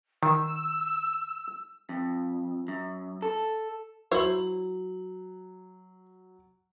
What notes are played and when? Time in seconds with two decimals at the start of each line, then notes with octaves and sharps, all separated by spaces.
0.23 D#3 E6
1.89 F2
2.68 F#2
3.22 A4
4.11 F#3 E4 C5 C#5 F#7